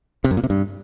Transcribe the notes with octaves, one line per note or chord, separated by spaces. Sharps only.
C3
F#2
A#2
C3
G2